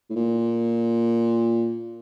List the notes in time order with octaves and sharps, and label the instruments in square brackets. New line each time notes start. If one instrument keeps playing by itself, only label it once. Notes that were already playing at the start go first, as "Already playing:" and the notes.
[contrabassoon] A2
A#2